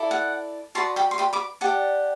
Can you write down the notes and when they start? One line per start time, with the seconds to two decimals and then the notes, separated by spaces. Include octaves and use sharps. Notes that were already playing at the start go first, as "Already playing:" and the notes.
Already playing: E4 A4 D5
0.11 F#5
0.75 F#4 B4 D5 A5 C6
0.96 G5 B5
1.11 C6
1.18 G5 B5
1.33 B5 D6
1.61 G4 D5 F#5 A5